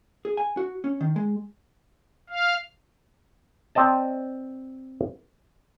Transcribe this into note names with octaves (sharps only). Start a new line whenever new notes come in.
G#4
G#5
F#4
C#4
D#3
G#3
F5
C4 D5 D#5 A5